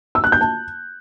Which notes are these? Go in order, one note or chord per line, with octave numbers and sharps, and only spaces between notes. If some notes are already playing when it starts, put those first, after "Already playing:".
E6
F#6
G6
A5